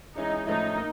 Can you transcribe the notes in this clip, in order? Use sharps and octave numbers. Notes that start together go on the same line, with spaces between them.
E3 G#3 C#4 D#4 E4
A2 F3 A3 C#4 D#4 E4
A#3